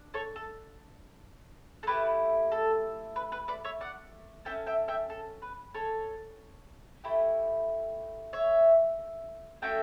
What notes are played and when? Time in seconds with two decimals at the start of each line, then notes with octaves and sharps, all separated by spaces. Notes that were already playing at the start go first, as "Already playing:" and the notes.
Already playing: D4
0.14 A4 C#5
0.36 A4
1.83 A4
1.87 A3 E4 G4 B4
2.52 A4
3.16 B4
3.32 B4
3.48 B4 D5
3.65 C#5 E5
3.81 D5 F#5
4.45 C#4 E4 A4 E5 G5
4.67 E5 G5
4.88 E5 G5
5.10 A4
5.42 B4
5.75 A4 C#5
7.04 A3 E4 G4
8.33 C#5 E5
9.62 A3 C#4 F#4 A4 E5 G5